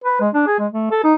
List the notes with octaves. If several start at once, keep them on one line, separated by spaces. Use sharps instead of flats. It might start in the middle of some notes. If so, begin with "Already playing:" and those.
B4
G#3
D4
G#4
G#3
A3
A4
D#4